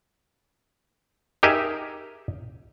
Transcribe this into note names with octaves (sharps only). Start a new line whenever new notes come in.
D#4 G4 G#4 A#4 D#5 E5